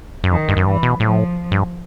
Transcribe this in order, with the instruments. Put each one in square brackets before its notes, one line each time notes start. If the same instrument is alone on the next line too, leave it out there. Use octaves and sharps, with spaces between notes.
[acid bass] F#2
[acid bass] F2 [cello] D#3
[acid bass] G2
F#2
[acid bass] G2 [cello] E3
[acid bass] B2
[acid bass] A2 [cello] F3
[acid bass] G2